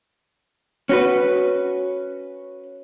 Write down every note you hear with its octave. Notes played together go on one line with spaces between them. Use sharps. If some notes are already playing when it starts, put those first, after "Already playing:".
C#4 F#4 B4